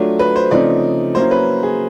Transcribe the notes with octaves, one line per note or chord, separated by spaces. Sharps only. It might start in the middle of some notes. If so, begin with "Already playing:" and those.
Already playing: F#3 A3 D4 F4
B4
C5
C#3 F3 A3 C4 D#4 D5
F#3 A#3 C#4 E4 C5
B4
G#4